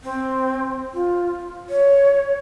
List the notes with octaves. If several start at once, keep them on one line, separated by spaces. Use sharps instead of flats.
C4
F4
C#5